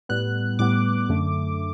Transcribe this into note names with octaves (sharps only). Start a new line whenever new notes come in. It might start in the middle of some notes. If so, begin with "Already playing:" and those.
A2 G3 B3 F#6
A2 G3 B3 D6
F#2 D3 A3